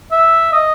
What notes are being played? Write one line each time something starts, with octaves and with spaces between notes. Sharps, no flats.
E5
D#5